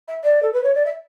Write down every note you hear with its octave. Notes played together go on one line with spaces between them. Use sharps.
E5
D5
A4
B4
C#5
D5
E5